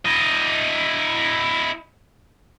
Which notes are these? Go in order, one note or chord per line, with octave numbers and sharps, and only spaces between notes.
E4 D#5